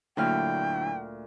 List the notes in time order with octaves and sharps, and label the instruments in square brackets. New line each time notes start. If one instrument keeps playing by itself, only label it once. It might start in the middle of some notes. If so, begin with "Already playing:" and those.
[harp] D2 A#2 F6 [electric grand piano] D3 F#3 E4 [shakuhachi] G5